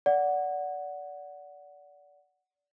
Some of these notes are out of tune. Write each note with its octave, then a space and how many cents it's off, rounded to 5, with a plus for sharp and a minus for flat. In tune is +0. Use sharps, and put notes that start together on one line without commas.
D5 -20 F#5 +0